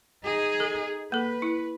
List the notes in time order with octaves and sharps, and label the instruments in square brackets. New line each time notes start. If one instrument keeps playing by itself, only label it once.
[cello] D#4 G#4
[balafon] A4
[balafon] A#3 A4 [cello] B4
[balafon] E4